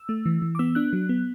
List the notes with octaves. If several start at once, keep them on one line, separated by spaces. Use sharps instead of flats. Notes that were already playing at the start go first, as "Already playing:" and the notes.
Already playing: E6
A3
E3
E3
D6
B3 E6
D4 F#6
F#3
B3